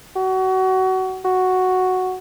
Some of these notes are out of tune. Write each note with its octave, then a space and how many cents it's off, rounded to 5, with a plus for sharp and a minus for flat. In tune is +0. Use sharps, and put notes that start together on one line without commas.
F#4 +25
F#4 +0